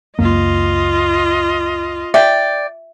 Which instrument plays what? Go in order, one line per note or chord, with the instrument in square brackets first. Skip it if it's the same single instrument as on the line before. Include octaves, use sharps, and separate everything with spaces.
[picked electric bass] C#2 F#2 A#3 [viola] F4 D#5
[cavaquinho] D5 G5 [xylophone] E5